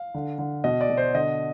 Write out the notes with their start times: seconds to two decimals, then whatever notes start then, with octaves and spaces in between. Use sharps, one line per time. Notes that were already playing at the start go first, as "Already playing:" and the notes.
Already playing: F5
0.14 D3
0.38 D3
0.64 B2 D#5
0.81 D5
0.89 B2
0.97 C5
1.14 D3 D#5